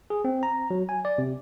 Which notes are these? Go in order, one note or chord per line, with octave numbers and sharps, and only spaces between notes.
G#4
C4
A#5
F#3
G#5
D5
C3